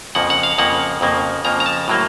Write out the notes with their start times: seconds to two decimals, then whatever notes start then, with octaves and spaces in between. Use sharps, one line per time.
0.15 F2 C#3 F3 A#3 F#5
0.30 F#5
0.43 F5
0.58 F2 C#3 F3 A#3 F#5
1.01 F2 C#3 F3 A#3
1.44 F2 C#3 F3 A#3 A#5
1.60 A#5
1.66 A5
1.88 A2 F#3 A#3